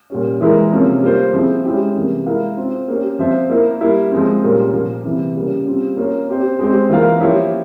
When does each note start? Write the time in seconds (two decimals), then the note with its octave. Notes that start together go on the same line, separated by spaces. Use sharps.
0.10 A#2 G3 C#4
0.41 E3 G#3 E4 A#4
0.72 C3 F3 A#3 C#4 F4
1.03 G3 A#3 F4 C5
1.33 F3 C4 E4 G#4
1.64 G#3 C#4 E4 G4
1.95 C3 E3 G3 A#3
2.26 G#3 E4 A#4 F5
2.57 C4 F4 C5
2.88 A#3 C#4 G4
3.19 F3 C4 F4 C5 E5
3.49 A#3 E4 A#4
3.81 G3 A#3 E4
4.11 F3 G#3 C4
4.42 A#2 G3 C#4 F4 A#4
4.73 A#2 F3 A#3
5.05 C3 E3 G3
5.35 C#3 G3 A#3 C#4
5.66 G3 C4 F4
5.97 A#3 C#4 F4 A#4 C#5
6.28 C4 G4 C5
6.59 G#3 C4 G4 C5
6.89 E3 A#3 F4 A#4 F5
7.20 F3 A#3 E4 G4 C#5